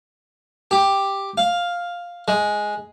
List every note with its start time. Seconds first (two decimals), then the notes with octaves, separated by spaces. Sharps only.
0.71 G4
1.38 F5
2.28 G#3